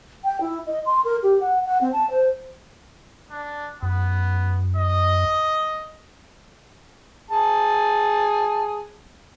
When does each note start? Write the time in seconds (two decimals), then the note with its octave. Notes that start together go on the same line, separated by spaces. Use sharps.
0.24 G5
0.41 E4
0.67 D#5
0.86 C6
1.05 A#4
1.23 G4
1.40 F#5
1.66 F#5
1.81 C4
1.93 A5
2.10 C5
3.31 D4
3.83 F#2 B3
4.77 D#5
7.31 G#4 A5